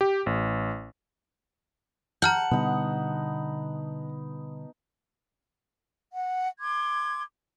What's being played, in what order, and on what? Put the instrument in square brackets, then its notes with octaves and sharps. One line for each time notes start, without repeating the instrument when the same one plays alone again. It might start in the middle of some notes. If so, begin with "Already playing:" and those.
[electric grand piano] G4
A1
[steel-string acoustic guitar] F#5 [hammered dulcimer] A5 [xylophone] A#5 F6 G6
[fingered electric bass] B2 D3 G3 [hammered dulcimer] B3 D#4
[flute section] F#5
C6 D6 G#6